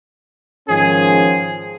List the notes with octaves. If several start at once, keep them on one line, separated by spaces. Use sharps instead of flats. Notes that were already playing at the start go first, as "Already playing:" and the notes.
G#2 D#3 F3 C#4 G#4